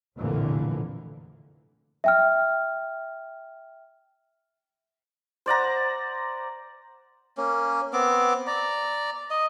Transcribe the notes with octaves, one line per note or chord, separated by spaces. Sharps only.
F1 A#1 A2 D3 E3 A#3
E5 G5 F6
C5 D5 F#5 A#5
A#3 C#4
B3 C4 D6
D5 A#5
D#5